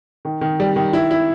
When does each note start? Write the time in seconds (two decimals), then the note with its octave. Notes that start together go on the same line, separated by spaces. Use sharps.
0.25 D#3
0.41 D#3
0.60 G3
0.76 D#3
0.93 E4
1.11 E4